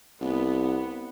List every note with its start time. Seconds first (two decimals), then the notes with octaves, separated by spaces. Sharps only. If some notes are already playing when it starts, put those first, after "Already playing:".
0.21 C2 B3